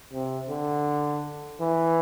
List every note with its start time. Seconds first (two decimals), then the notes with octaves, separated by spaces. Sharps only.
0.13 C3
0.49 D3
1.61 E3